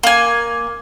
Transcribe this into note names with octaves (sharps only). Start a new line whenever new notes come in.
A#3 G#5